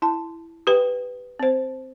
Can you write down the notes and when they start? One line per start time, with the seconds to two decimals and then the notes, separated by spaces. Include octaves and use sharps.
0.02 E4 A5
0.67 G4 B4 G5
1.40 C4 C5